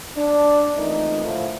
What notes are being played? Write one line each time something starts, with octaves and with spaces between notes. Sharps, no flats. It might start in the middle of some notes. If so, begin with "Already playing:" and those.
D4
F2 E3 A3 A#3 D#4
A2 D3 F3